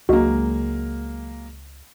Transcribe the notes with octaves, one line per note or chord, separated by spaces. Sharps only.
C#2 F#3 G#3 A#3 D4 F#4 D#5